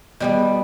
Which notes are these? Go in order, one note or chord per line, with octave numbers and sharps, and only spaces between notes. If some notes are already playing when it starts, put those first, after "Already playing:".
B2 G3 B3